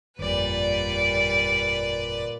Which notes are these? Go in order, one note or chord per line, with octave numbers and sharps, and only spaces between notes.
G1 F2 A#2 G3 B4 D5